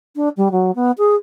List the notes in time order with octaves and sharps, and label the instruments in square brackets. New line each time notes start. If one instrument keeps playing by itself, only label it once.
[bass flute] D4
G3
F#3
B3
G#4